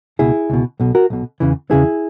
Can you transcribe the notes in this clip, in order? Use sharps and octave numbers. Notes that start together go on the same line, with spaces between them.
C#2 B2 E4 G#4
C#2 B2
B1 B2
F#4 A#4
B1 B2
E2 C#3 E3
E2 C#3 E3 E4 G#4